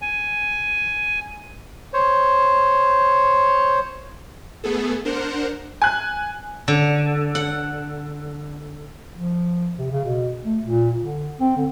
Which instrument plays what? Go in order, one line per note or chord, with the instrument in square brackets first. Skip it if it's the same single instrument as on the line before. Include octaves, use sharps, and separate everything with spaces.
[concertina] G#5
C5 C#5
[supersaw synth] A3 B3 G#4 A4
D4 A#4 C5 F#5
[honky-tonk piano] G#5 F#6
[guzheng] D3
F#5
[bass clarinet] F3
C3
C#3
B2
A3
A#2
D3
C4
D3